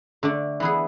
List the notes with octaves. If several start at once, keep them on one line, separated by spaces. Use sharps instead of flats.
D3 A3 D4
E3 B3 E4 G#4